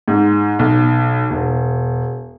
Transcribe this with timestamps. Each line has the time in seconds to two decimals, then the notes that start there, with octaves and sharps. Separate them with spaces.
0.08 G#2
0.59 B1
1.30 E1